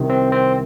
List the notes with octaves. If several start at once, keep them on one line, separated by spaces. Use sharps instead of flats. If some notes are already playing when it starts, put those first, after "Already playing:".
Already playing: C2 C3 D#3
C4
C4